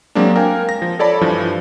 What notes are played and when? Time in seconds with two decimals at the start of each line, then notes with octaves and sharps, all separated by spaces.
0.15 F#3 G#3 A#3 C4 D4
0.36 A#4 F5 G5 G#5
0.69 A#6
0.82 F3
0.99 A4 C#5 D5 A5 B5
1.21 G2 E3 F3